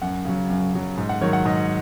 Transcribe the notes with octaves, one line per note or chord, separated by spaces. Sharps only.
F#2 F#5
C#3 F#3
F#2
C#3 F#3
G#2
F#5
D#3 F#3 C#5
F#5
G#2 D#5